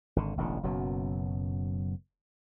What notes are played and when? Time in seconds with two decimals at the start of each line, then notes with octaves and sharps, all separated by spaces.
0.16 G#1 D3
0.37 E1 A1 D3
0.63 F#1 F#2 B2 F#3